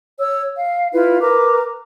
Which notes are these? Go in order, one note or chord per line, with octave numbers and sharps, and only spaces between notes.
C#5 E6
F5
E4 F4 B4
A#4 B4 A#5 D6